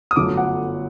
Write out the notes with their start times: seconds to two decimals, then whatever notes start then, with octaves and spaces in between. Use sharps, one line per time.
0.11 D#6
0.16 G1 F#2 F#3 A3 D6
0.37 F#5